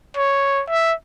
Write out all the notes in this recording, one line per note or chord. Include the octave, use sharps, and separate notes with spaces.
C#5
E5